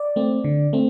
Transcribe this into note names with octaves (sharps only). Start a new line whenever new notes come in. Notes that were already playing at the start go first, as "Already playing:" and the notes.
Already playing: D5
A3 C4
D3
A3 C4